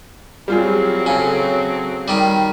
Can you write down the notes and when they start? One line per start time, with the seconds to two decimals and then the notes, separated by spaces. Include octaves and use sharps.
0.48 F#3 G3 C4 F4 G#4
1.06 C#3 A4 G#5
2.08 D#3 G3